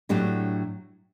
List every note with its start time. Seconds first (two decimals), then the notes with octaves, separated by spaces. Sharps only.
0.09 A2 F#3 A3 D4 G4